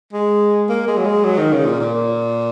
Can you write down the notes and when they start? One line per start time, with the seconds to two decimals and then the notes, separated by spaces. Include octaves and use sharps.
0.13 G#3
0.69 A#3
0.87 G#3
0.97 F#3
1.05 G#3
1.24 F#3
1.38 D#3
1.52 C#3
1.65 A#2
1.80 A#2